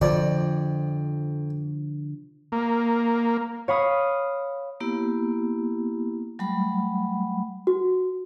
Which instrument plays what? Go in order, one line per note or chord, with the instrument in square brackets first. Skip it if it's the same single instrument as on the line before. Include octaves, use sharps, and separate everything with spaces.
[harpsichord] F2 D5 [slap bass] D3 F3
[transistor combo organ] A#3
[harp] C#5 F5 B5 D#6
[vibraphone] A#3 B3 E4 G4
F#3 G3 A3 F#5 B5
[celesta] F#4